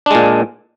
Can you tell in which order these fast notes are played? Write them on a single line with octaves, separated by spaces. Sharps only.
D4 G#3 A#2